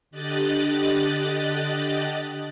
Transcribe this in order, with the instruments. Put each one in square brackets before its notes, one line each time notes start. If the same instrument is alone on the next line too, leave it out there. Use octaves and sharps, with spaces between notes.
[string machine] D3 G4 D#5 F#6 A6